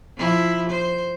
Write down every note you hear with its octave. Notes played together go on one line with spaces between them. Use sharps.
F3 E4
C5